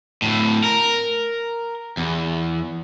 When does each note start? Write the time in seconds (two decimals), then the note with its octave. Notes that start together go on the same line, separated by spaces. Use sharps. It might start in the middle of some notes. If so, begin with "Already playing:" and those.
0.22 D2 A2
0.64 A#4
1.97 E2